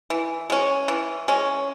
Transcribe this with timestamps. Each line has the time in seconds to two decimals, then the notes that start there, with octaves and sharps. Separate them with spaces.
0.10 E3
0.50 G#3 C#4
0.88 E3
1.28 G#3 C#4